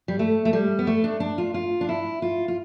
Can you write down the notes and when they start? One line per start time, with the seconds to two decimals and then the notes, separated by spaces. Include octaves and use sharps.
0.08 G3
0.19 A3
0.45 A3
0.53 G3
0.79 B3
0.87 A3
1.04 D4
1.20 D4
1.38 F4
1.54 F4
1.81 D4
1.89 E4
2.22 F4
2.48 F4